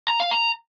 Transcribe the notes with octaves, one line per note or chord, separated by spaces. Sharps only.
A#5
F5
A#5